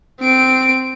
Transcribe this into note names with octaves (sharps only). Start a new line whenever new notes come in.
C4 D7